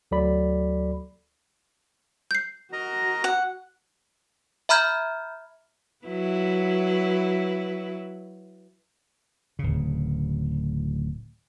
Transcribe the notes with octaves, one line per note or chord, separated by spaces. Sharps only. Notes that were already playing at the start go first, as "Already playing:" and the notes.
D2 F#3 F#4 A4 D5 B5
G6 C7
F#4 A#4 D#5 A#5
F#5
E5 A#5 B5 F6 G6 G#6
F#3 E4 B4
D1 C#3